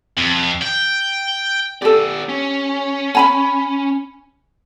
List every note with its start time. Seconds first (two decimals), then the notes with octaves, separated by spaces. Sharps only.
0.17 F2
0.62 G5
1.82 B3 G4 A4 D5
2.29 C#4
3.15 G#5 A#5 B5